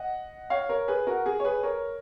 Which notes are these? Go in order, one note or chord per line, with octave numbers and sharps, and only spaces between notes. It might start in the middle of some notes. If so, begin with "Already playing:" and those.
Already playing: D#5 F#5
C#5 F5
A#4 C#5
G#4 B4
F#4 A#4
G#4
C#5
G#4 B4
A#4 C#5